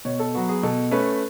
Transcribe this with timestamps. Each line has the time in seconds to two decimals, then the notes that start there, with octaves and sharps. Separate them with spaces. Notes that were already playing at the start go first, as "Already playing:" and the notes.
0.05 B2 C#5
0.20 A4
0.34 F#3 B3 F#4
0.49 G#4
0.63 B2 A4
0.91 A3 C#4 B4